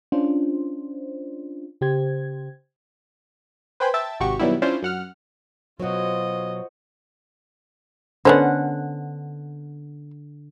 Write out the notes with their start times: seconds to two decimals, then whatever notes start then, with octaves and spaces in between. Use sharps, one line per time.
0.12 C#4 D4 F4 C5
1.81 C#3 G4 C5 G#6
3.80 B4 C5 G5 G#5 B5 C6
3.94 E5 G5 A5 E6 A6
4.20 G#1 C3 F#4 G4 C#6
4.39 B2 D#3 F#3 G3 B3 E4
4.62 C#4 D4 E4 F4 C5
4.83 F#2 F#5 F6
5.80 B2 F#3 F4 F#4 C5 C#5 D#5
8.25 D3 B3 C#4 C5 F#5